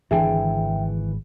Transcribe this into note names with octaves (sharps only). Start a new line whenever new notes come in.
G#1 D3 E3 D4 G#4 E5 G5